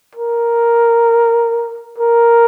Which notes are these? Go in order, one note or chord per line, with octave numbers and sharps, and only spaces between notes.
A#4
A#4